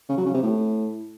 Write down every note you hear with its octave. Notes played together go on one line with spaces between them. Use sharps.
C#3
F#3
C#3
C3
A2